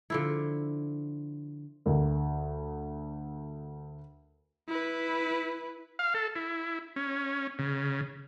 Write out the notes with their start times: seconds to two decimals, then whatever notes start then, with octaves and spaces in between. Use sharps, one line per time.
0.10 D3 F3 E4
1.86 D2 A#4
4.68 E4 B4
5.99 F5
6.14 A4
6.36 E4
6.96 C#4
7.59 C#3